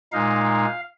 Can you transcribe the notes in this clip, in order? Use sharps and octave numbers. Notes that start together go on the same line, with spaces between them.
A#2 G#3 D#4 F5